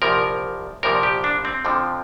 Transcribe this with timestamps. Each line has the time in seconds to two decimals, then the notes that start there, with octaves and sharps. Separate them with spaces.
0.02 C2 A#2 F3 A#4
0.83 C2 A#2 F3 A#4
1.03 G4
1.24 D4
1.45 C4
1.65 F2 D3 F3